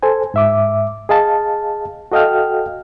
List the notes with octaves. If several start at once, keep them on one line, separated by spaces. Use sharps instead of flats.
A4 C5 G#5
G#2 E5 D6
G#4 D#5 F5 A5
F#4 A4 D#5 F5 G5 F6